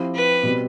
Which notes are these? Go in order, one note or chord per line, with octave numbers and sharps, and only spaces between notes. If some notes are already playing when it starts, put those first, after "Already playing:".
Already playing: F3 C4 E4 G4
B4
B2 G3 C4